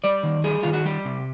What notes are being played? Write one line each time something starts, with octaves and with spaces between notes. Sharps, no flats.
G3 D5
D#3
G3 G#4
D#3 F4
F#4
G3 G4
C3